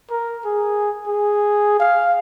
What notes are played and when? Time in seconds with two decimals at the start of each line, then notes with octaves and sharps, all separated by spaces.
0.11 A#4
0.45 G#4
1.07 G#4
1.80 F5